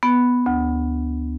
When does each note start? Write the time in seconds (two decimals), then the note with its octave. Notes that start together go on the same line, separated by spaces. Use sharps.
0.03 B3
0.46 D2